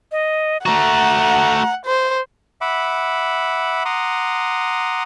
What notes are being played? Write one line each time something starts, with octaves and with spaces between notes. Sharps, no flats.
D#5
A3 F#4 F#5 A#5
C5
E5 F#5 B5 D6
F#5 A#5 C6 D6 D#6